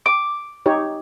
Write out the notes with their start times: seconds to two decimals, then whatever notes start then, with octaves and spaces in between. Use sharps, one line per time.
0.06 D6
0.66 D#4 G4 C#5